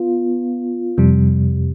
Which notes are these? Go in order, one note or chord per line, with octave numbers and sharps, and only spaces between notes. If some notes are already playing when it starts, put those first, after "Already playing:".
Already playing: B3 F4
F2 C3 G3